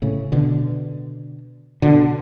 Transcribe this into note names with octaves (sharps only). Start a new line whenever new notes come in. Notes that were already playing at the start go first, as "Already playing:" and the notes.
A2 C#3
B2 D3
B2 D3